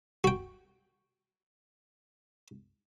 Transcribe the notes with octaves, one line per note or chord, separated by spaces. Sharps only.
F#4 G5